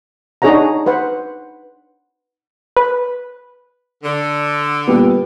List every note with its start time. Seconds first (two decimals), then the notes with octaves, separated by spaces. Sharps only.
0.42 D4 D#4 G#4 C#5 F#5 A#5
0.86 B4 C5 F#5
2.77 B4
4.04 D3
4.88 A#2 G3 B3